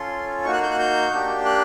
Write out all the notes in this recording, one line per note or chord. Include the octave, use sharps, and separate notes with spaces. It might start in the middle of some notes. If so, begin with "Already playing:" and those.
Already playing: C#4 F4 A4 C6
A#3 D#4 F#4 C#6
F#6
G6
F#6
G6
A#3 D4 G4
F#6